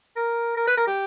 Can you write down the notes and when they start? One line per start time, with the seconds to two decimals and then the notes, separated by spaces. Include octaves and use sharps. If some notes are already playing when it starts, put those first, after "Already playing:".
0.16 A#4
0.57 A#4
0.67 B4
0.77 A#4
0.87 G4